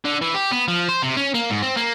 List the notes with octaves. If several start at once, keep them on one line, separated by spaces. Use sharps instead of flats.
D3
E3
G4
B3
F3
C5
C3
C#4
A#3
G#2
C4
A#3